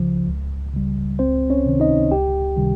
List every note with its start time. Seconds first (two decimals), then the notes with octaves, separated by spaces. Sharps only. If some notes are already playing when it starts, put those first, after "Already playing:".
Already playing: C#2 C#3 F3
0.29 C#2
0.73 C#3 G3
1.19 C#2 C4 C5
1.50 C#4 C#5
1.66 C3 D#3
1.80 D#4 D#5
2.11 C#2 G4 G5
2.56 C3 D#3 G3